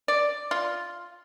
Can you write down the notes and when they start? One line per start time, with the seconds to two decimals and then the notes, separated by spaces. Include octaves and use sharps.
0.08 D5
0.51 F4